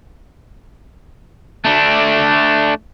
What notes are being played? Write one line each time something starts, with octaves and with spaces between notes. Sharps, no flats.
A3 D4